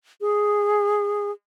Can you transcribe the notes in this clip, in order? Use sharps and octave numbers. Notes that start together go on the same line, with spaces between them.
G#4